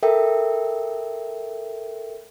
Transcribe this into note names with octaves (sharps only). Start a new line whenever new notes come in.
A4 A#4 E5 G5